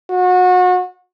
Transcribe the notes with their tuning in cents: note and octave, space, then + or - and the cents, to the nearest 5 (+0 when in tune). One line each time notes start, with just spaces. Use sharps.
F#4 -30